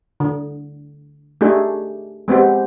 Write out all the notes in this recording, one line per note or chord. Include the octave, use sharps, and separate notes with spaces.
D3
A3 D4 D#4 G4 G#4
G#3 B3 C4 G4